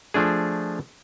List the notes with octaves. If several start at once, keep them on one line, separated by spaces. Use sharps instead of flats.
F3 A3 D4 G#4